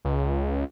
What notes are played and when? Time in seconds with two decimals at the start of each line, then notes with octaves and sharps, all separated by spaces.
0.05 C#2